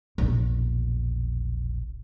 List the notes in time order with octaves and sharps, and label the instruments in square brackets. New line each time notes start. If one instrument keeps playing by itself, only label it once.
[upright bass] E1 A#1